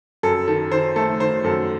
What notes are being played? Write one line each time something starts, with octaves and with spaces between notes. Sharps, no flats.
F#2 A4
D#3 A4
D#3 C5
A3 A4
D#3 C5
F#2 A4